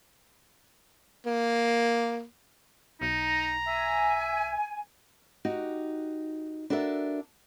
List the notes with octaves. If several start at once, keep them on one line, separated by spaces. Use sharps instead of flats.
A#3
B1 D#4 A#5
E5 G#5
D#4 F#4 G4
D4 F#4 A4 A#4 E5